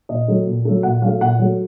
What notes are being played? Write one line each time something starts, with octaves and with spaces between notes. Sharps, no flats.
A#2 D#5
F#3 A3
A#2
F#3 A3
A#2 F#5
F#3 A3 F5
A#2 F#5
F#3 A3